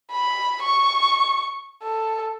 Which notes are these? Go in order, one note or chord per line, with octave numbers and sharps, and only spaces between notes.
B5
C#6
A4